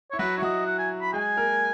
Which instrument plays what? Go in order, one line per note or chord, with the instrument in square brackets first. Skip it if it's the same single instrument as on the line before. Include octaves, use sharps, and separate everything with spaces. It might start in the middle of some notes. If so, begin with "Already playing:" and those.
[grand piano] E4 [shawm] C#5
[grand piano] F#3 F#4 [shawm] B4
[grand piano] E4 [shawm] C#5
[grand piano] F#3 F#4 [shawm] D#5
[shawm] F#5
G#5
B5
[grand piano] G#3 G#4 [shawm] G#5
[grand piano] A#3 A#4